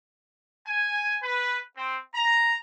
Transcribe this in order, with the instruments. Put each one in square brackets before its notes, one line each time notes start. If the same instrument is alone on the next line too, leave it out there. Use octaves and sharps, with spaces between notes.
[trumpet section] G#5
B4
C4
A#5